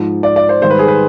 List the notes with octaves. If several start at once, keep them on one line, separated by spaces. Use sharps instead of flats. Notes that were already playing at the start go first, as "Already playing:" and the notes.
Already playing: G#2 F3
D5
D5
C5
G#2 D#3 G3 C5
B4
G#4
B4